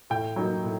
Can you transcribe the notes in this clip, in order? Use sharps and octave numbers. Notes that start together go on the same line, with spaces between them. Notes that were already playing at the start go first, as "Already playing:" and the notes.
A2 G5
F#3 A#3 D#4
A2